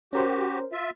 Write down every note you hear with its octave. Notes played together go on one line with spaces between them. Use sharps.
C#4 F#4 G4 A#4 C5
F4 E5